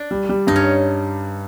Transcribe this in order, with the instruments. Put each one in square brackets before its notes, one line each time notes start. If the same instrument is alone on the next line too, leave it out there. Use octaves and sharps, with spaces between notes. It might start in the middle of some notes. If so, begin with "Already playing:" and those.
Already playing: [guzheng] D4
[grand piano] G3
G3
[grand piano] G2 [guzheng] D#4
[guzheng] C#4